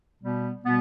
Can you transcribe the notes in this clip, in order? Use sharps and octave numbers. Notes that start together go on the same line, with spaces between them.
B2 G3 B3
B2 G3 B3